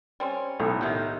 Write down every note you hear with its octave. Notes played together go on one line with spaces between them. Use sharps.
G3 C4 C#4
B1 A2
D#3 F#3 D#4 E4 G4